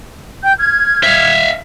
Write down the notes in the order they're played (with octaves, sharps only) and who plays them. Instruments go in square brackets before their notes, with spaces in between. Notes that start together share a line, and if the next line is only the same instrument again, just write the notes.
[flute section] G5 G6
F6 G#6
[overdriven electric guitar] E5 F5